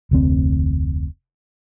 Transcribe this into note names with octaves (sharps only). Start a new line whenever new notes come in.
F1 D2 C4